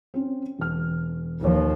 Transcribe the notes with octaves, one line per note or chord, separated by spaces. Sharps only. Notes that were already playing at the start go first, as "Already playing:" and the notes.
C4 C#4
E1 F6
D#2 F3 B4 C#5